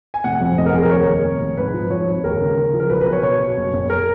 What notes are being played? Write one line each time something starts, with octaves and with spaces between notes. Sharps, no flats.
G#5
F1 F#5
F2
F1 D#5
A#4
F2 G#4
A#4
D#2 C#5
D#2
F1
F1
G#2 B4
F3
F3 C#5
G#1
D#2 A#4
C#3
C#3
F3
A#4
B1 B4
B4
B2
C#5
B2 C#5
B2
F#1
F#1
A#4